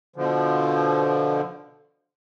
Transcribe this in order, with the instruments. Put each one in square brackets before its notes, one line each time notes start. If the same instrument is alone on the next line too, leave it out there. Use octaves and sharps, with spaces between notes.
[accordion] B2 D3 F3